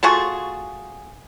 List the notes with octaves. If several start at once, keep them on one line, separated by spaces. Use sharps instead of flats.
A3 F4 F#4 G#4